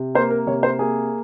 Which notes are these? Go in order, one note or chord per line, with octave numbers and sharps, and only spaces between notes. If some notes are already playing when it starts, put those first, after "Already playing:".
Already playing: C3
A#3 C5
A#4
C3 C#5
C5
A#3 G#4